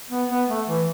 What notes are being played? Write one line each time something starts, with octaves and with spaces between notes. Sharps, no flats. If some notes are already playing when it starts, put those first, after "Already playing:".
B3
B3
A3
E3